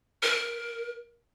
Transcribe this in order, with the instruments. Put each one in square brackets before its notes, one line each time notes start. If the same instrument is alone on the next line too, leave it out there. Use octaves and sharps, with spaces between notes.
[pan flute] A#4